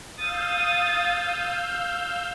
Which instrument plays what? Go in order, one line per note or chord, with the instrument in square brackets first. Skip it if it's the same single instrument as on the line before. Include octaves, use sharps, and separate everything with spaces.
[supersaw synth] F5 E6 G6 [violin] D#6 A6